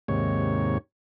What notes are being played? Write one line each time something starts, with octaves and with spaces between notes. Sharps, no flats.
D#2 G#2 C3 C#5